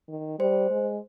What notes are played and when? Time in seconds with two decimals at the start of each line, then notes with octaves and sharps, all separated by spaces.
0.08 D#3
0.39 G3 C5
0.70 G#3